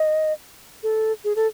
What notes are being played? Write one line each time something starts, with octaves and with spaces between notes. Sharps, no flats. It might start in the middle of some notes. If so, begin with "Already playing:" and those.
Already playing: D#5
A4
G#4
A4